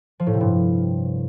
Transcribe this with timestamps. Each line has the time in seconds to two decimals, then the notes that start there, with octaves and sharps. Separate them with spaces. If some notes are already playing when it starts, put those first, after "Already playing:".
0.20 F3
0.27 A2
0.34 C3
0.41 G2